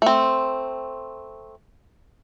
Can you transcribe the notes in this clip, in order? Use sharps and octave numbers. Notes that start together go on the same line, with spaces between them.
A3 C4